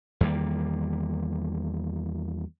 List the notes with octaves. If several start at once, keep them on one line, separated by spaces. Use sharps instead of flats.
E2 D#3 G3 A#3